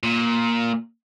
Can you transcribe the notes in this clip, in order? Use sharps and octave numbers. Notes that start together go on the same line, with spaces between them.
A#2